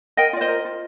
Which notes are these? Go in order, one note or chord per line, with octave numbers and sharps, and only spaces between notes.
A#4 D#5 G5
F4 D5
C5 D#5
A#4
F4